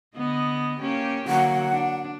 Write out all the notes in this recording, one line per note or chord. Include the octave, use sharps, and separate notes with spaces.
D3 B3 D#5
A#3 C#4 G4
D3 F#3 A#3 F#5
D4